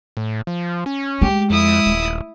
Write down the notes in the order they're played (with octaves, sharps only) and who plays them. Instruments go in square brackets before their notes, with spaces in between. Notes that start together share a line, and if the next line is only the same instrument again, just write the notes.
[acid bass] A2
F3
C#4
[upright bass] G#3 [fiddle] G4
[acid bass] F2 [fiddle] E4 D#6
[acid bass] D#1